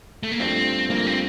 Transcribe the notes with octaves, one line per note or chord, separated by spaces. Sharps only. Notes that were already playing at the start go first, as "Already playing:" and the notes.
A3
A#3
G2 F3 A3 C4 D4
G2 F3 A3 A#3 D4
C4